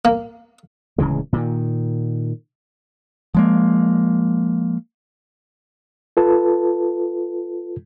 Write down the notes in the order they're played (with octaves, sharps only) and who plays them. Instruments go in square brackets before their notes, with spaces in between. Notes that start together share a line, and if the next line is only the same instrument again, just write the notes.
[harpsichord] A#3
[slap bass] D1 C#3 E3 G#3
A#2 D#3
[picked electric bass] F3 G#3 A#3
[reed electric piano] F4 A4 B4 A5